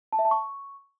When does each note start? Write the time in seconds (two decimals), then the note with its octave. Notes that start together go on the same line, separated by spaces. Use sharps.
0.13 A5
0.19 E5
0.25 A5
0.31 C#6